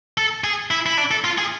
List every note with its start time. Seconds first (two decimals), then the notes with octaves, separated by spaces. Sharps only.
0.18 A4
0.44 G#4
0.71 E4
0.86 E4
0.98 D4
1.11 A4
1.24 F4
1.38 G#4